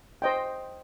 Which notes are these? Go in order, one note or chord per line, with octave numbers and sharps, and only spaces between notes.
C5 D#5 G5